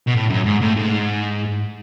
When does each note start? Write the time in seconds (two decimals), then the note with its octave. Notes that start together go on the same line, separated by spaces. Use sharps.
0.08 B2
0.15 A2
0.30 F#2
0.46 G#2
0.61 A2
0.76 G#2